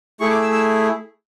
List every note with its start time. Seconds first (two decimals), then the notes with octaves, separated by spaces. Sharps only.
0.20 A3 E4 G#4 C#6
0.30 D6
0.41 E6
0.52 E6